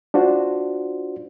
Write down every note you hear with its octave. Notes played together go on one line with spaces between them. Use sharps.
D4 F4 F#4 C5